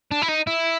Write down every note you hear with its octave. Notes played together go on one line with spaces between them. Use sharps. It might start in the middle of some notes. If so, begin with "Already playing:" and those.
D4
E4
D#4
E4